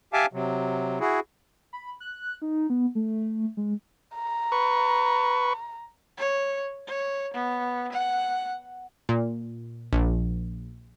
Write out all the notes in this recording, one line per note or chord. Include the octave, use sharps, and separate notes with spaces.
G4 E5 F5 G#5 A5 D6
C3 F#3
E4 F#4 G#4
B5
F#6
D#4
B3
A3
G#3
A#5
B4 C#6
C#5
C#5
B3
F#5
A#2
A#1